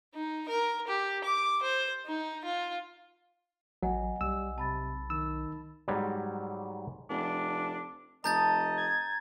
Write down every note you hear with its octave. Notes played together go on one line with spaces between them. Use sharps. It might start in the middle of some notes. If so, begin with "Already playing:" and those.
D#4
A#4
G4
D6
C5
D#4
F4
A1 F#3 D#5 F#5 G#5
B1 G3 E6
C3 A5 B5 A6
D#3 E6
G#2 F#3 G3
F1 D4
F1 D#5 A5 A#5 G6 A6
G#6